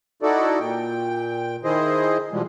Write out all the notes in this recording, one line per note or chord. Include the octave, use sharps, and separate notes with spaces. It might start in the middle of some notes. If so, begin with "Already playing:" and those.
D#4 E4 F#4 A4 D5
A#2 G5
D#3 E4 G#4 C5 D#5
B2 E3 F3 G3 G#3